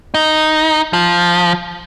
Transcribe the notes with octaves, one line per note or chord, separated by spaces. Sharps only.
D#4
F3